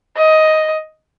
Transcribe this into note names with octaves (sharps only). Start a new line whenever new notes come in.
D#5